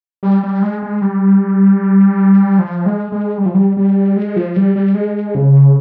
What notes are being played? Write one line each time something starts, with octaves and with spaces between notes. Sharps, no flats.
G3
G3
G#3
G#3
G3
F3
G#3
G#3
G3
F3
G3
G3
G#3
F3
G3
G3
G#3
C#3